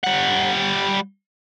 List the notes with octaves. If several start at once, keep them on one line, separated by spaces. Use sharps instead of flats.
G3 F#5